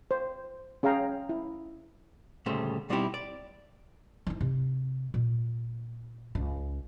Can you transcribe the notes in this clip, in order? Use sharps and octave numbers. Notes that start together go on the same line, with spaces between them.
C5
C#4 G#4 F5 G5 A#5
E4
D2 A#2 C#3 G3 A3 C5
B2 G3 C4 D#4 E4 G4
D5
E3 D#4
C3
A#2
C#2